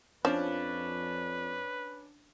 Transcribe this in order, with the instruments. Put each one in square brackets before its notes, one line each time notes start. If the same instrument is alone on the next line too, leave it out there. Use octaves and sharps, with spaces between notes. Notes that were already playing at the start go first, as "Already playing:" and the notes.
[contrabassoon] F2 [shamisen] F3 [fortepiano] C#4 D4 [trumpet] B4